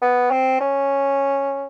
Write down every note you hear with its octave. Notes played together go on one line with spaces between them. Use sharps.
B3
C4
C#4